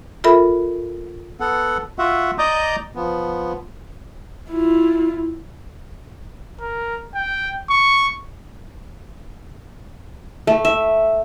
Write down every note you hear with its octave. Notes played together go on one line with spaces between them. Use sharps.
F4 A4 A#4 E5 B5
B3 A4 F#5
F4 F#4 E5 F#5
D5 D#5 A#5 D6 D#6 G6
F3 B3
E4 F4
A#4
G5
C#6
A3
E5